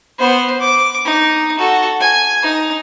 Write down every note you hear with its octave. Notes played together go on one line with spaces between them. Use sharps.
B3 C5
D6
D#4
F#4 A4
G#5
D#4